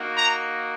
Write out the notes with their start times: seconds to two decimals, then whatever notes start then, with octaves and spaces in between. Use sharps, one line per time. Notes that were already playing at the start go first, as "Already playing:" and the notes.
Already playing: A#3 D#4 F#4
0.16 A#5